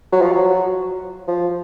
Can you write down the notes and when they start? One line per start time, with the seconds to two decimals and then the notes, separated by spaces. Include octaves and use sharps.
0.12 F#3
0.21 F3
0.32 F#3
1.27 F3